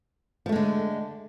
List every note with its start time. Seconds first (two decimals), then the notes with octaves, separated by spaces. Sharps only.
0.46 F3
0.49 A3
0.52 G#3
0.56 D3